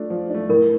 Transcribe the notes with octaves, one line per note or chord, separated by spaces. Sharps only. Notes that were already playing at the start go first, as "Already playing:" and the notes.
Already playing: A3 D4 F4
F3
A3 D4
A2 A#4